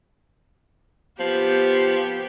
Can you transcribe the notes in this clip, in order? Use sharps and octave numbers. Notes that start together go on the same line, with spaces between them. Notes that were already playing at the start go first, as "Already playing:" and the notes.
F3 B3 G4